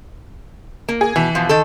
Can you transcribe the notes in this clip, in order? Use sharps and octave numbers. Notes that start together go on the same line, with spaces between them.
A#3
G#4
B2 E3
B2 F3
D#3 A4